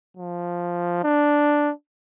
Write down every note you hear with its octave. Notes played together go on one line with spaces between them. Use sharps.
F3
D4